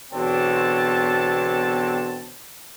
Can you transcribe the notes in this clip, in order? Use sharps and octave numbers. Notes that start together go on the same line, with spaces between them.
E2 B2 D3 C4 C#5 A5